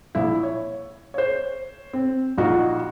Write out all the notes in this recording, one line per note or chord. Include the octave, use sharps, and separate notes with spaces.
A#1 E4
C#5
C5 C#5
C4
A#1 D#4 F4 F#4